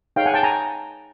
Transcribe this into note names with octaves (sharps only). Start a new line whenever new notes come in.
D#4 G#4 C#5 F5 G5
F#5 G#5
G5 A5
G#5 A#5